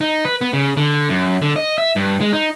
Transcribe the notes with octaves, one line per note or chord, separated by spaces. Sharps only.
D#4
B4
B3
C#3
D3
F#2
D3
D#5
E5
G2
G#3
D#4